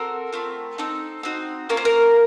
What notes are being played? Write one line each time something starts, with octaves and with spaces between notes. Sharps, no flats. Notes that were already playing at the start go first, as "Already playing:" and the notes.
Already playing: C4 F#4 A4 A#4
A3 C4 F4
C4 D#4 A4
C4 D#4 F#4
A#3 C#4 F4 A#4
C5
A#4